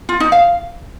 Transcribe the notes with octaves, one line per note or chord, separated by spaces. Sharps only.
F4
D#4
F5